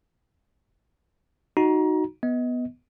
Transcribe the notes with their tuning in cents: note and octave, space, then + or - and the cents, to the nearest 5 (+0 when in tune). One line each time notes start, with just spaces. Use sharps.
D#4 +0 F#4 +0 A#5 +25
B3 +0 D#5 +25